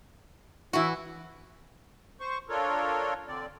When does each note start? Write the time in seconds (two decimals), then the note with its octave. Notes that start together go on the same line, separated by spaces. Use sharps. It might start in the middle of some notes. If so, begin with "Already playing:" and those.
0.73 E3 E4 F#4
2.20 C5 C#6
2.49 D4 F4 A4 A#4 C#5
3.28 D3 C4 D5